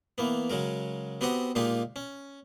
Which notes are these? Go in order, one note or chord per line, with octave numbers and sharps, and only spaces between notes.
E3 A#3 B3
C#3 F#3 G#3 A#4
B3 C4 F#4 G4 D#5 F#5
A#2 G#3 A#3 D#4 F4 G4
C#4